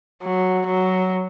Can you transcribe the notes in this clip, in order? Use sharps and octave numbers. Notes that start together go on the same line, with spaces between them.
F#3
F#3